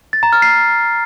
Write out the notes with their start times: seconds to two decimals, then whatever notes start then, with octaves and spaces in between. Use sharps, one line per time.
0.13 A6
0.23 A#5
0.33 F6
0.42 C7